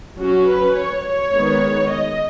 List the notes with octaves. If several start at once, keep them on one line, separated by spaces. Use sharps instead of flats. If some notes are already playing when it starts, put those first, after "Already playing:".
F#3 C#4 F#4
B4
C#5
C#5
D#3 G#3 B3
D#5